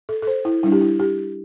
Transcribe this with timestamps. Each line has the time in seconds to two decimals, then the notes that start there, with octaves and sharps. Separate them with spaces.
0.09 A4
0.22 A4
0.27 C5
0.45 E4
0.63 G3 D4 E4
0.72 G4
0.81 E4
1.00 G4